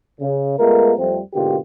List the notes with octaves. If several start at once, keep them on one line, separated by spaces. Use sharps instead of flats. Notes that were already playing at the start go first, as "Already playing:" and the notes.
C#3
G#3 A3 B3 F4 A#4
F2 F3 G3 A3 C4
G#2 B2 D3 A#3 F4 G4